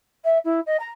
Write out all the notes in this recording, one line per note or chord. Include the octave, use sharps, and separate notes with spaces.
E5
E4
D#5
A#5